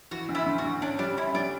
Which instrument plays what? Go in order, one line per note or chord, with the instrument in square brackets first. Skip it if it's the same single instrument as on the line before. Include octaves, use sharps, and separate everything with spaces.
[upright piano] E3 [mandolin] F#4
[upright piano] D2
[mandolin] E4
[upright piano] D2
[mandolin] F#4
[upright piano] D2
[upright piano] C#4 [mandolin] D4
[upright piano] G3 [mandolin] D4
[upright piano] C#4 [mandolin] E4
[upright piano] G3 [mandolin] D4